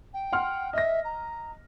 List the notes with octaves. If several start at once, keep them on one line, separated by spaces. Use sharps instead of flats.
G5
F#5 C6 F6
D#5 E5 A#6
A#5